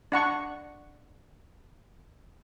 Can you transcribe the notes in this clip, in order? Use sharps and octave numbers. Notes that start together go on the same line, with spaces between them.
D4 F#5 C#6